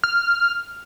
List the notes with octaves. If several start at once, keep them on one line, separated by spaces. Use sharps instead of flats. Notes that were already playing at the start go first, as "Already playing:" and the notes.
F6